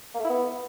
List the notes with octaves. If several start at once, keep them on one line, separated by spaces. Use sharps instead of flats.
A#3
A3
E4
B3